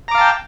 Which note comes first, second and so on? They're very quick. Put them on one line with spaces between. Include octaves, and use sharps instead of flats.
A#5 D6 F5 A5 G5